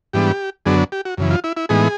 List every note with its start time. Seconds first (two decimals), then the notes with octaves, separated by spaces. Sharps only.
0.13 G#2 E3 G3 B3 D4 G4
0.66 F#2 D3 F#3 B3 D4 G#4
0.92 G4
1.05 F#4
1.17 F#2 C#3 E3
1.31 F4
1.44 E4
1.57 E4
1.69 A2 E3 G#3 B3 D#4 G#4